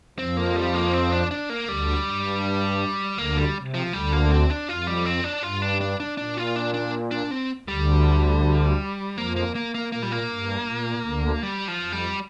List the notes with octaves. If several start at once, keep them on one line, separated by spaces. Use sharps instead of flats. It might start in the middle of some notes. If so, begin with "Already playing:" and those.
F2 F3 C4
A#3
G3
A#3
C4
D4
D4
A#3
D2 D3 G3
G2
D2 D3 A#3
G3
C3
F3
D2 D3 G3
A#3
C4
D4
F2 F4
G3
C4
D4
G2 F4
D4
D4
D4
A#2 D4
F4
D4
D4
D4
C4
D2 D3 G3
F2 F3 A#3
A#3
A#3
A#3
A#2 A#3
G3
A#3
G2
A#2
D2 D3
G3
F3
F2
G3